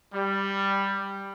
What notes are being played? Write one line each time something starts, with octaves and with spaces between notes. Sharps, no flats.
G3